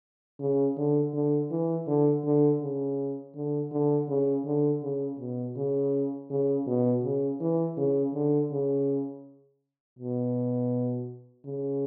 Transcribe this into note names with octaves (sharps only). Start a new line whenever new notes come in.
C#3
D3
D3
E3
D3
D3
C#3
D3
D3
C#3
D3
C#3
B2
C#3
C#3
B2
C#3
E3
C#3
D3
C#3
B2
C#3